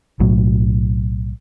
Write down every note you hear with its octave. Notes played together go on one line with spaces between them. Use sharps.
B1 A2 F#3